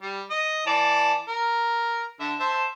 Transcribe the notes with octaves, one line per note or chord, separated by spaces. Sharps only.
G3
D#5
E3 D5 A5
A#4
D3 E5
C5 E5 A5